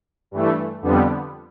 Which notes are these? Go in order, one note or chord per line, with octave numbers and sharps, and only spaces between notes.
G2 E3 A3
F2 D3 G3 B3